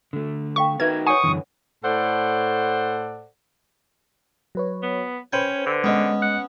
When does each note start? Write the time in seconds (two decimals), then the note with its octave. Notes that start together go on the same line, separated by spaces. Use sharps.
0.13 D3 A3
0.56 A4 F5 G5 C#6
0.80 D#4 F#4 A#4 B4 E5 G#6
1.06 C#5 F#5 G#5 C#6 D#6
1.24 F#2 D3 E3
1.83 A2 A4 C5 D5 F#5
4.55 F#3 B4 C#5
4.83 B3
5.33 C#4 B4 C5 G5 B5 G#6
5.66 D3
5.84 G#3 B3 C#4 D#5
6.22 F#5